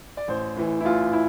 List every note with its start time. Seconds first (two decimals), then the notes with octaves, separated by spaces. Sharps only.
0.17 D5
0.28 A1 C5
0.56 A2 E3
0.80 E4
0.85 A1 F4
1.13 E4